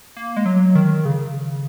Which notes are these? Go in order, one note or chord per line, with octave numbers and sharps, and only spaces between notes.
A#3
G#3
F#3
D#3
C#3